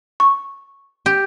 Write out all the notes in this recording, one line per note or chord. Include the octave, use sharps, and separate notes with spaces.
C#6
G4